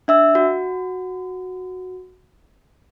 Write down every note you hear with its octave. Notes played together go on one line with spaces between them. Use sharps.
D4 E5 E6
F#4